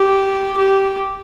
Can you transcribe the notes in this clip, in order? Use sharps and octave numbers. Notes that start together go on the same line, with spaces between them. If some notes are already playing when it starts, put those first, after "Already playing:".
Already playing: G4
G4